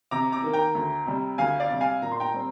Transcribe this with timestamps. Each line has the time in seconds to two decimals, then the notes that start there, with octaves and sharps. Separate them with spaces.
0.11 C3 A#5 D6
0.32 A#5 D6
0.43 D#3 A#3
0.53 G5 A#5
0.75 D2
1.06 C3 G3
1.38 D2 F5 G#5
1.60 D5 F5
1.70 C3 G3
1.81 F5 G#5
2.02 A#2 A#5
2.12 C6
2.20 G5 A#5
2.34 G3 C4